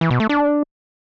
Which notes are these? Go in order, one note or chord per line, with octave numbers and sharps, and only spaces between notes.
E3
B2
A3
D4